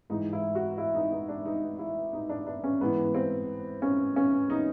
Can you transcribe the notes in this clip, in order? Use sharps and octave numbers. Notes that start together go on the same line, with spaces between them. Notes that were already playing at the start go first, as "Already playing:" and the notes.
G#2 E3 D#4
E4
F#4
E4
D#4
D#4
D4
D#4
E4
D#4
D4
D4
C#4
G#2 E3 B3
C4
C#4
C#4
D#4